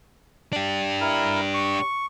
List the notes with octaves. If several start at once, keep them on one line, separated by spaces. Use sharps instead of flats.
D4 G4
E4 A#4
C#6